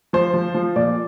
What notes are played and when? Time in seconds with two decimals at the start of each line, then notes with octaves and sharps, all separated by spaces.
0.13 F3 C5
0.34 F3
0.55 F3
0.76 A#2 D5